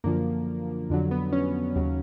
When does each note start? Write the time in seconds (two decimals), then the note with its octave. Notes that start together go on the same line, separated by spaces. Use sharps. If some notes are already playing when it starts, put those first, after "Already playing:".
0.04 F#2 D3 F3 A#3
0.90 F2 D3 F#3
1.11 B3
1.32 C#4
1.75 D#2 C#3 F#3